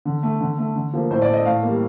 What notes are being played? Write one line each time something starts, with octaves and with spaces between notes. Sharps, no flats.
D3
A3
D3
A3
D3
F3 A#3
A2 C5
D5
A3
D#5
A2 F5
G3 A#3